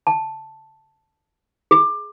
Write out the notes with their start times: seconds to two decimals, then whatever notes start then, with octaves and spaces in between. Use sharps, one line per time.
0.07 A5
1.71 G#4